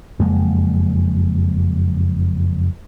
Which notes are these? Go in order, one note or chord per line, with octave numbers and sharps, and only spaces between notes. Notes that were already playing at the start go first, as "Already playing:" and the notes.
F#1 F2 G#3 A#3